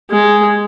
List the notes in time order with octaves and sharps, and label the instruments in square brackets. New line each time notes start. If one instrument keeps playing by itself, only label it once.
[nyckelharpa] G#3